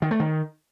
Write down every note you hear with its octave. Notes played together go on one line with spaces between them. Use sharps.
D#3
A3
D#3